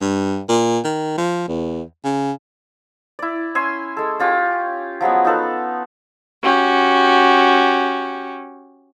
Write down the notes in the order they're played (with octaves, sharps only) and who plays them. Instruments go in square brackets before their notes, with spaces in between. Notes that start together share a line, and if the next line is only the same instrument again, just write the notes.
[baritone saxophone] G2
A#2
D#3
F3
E2
C#3
[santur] E4 D5
C#4 E5 G#5 C6
G#3 A4
C#4 F4 G4 G#5
F3 F#3 G#3 B3
D#4 F4 A4 B4
[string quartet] C#4 F#4 G4